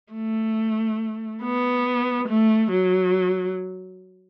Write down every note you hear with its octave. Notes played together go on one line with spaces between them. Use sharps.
A3
B3
A3
F#3